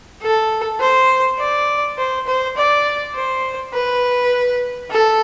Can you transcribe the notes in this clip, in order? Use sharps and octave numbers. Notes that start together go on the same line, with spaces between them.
A4
C5
D5
C5
C5
D5
C5
B4
A4